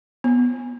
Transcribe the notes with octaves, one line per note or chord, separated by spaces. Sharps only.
B3